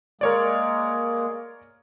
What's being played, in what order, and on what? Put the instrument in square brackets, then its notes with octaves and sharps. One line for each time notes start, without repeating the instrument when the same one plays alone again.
[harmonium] G#3 A#3 G#4 [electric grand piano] A#4 C#5 D5